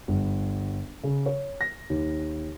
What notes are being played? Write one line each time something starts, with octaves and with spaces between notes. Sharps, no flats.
G1
C#3
C#5
A#6
D#2